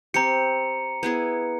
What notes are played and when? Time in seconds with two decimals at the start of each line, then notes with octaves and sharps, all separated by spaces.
0.14 C4 G4 A#5 C#7
1.03 B3 E4 G#4